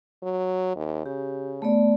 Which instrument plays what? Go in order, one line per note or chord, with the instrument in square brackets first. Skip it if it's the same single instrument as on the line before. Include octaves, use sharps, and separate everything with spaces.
[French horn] F#3
D#2
[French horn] C#3 [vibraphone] G4
[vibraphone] A3 B3 D5